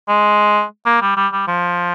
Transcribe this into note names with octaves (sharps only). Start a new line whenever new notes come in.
G#3
A#3
G3
G3
G3
F3